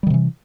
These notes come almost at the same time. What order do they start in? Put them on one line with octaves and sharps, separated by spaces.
G3 D#3 C3 E3